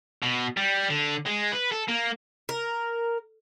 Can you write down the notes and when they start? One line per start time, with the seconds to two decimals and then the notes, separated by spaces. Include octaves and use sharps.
0.23 B2
0.57 G3
0.90 D3
1.26 G#3
1.52 B4
1.72 A4
1.88 A#3
2.49 A#4